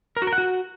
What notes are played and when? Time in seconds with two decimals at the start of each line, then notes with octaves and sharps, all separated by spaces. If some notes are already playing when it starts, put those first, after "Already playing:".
0.17 A#4
0.22 F#4
0.27 A#4
0.33 F#5
0.38 F#4